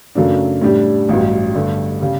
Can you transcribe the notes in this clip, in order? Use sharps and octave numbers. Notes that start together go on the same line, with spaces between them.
F#2 C#3 F#3 A3 D4
A2 G3 D4 G4
A1 G2 F#3
G2 D3 A3
C#3 G3